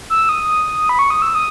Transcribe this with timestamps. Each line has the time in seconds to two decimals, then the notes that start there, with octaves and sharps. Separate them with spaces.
0.10 E6
0.29 D#6
0.89 B5
0.99 C#6
1.10 D#6
1.22 E6
1.35 D#6